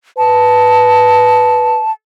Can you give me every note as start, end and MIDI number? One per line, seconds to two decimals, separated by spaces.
0.18 1.80 71
0.18 1.91 81